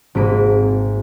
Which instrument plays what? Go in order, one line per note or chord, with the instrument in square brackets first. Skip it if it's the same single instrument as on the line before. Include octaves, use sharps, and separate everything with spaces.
[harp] G#1 G#3 A#3 C4 B5 D7